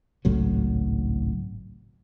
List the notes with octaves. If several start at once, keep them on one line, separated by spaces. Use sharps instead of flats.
G#1 C#2 A2 F#3